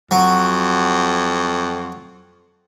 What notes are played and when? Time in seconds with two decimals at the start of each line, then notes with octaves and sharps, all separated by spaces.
0.11 F2 F#3